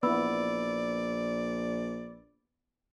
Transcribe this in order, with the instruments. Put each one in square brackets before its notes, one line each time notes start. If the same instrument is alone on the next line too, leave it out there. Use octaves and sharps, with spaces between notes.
[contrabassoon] A#1 [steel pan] B3 E4 [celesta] B4 B5 E6 [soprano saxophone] D5